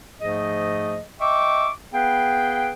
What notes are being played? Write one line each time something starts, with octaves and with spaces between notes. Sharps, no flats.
G#2 F3 A3 G#4 D#5
D#5 E5 G5 C#6 D6
B3 G#4 B4 F5 G5